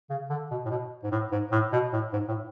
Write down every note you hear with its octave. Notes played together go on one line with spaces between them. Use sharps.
C#3
D3
B2
A2
B2
G#2
A2
G#2
A2
B2
A2
G#2
A2